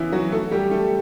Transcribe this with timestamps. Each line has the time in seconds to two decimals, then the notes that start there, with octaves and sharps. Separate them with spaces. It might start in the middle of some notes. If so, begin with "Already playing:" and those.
Already playing: C#3 E3 B3 C#4 E4
0.12 F#3 F#4
0.32 A3 A4
0.51 G3 G4
0.71 A3 A4